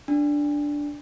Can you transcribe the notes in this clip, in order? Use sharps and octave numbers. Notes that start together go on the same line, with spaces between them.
D4